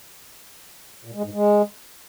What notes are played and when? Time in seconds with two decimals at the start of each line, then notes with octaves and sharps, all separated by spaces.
1.05 A#2
1.14 G#3
1.24 G#2
1.33 G#3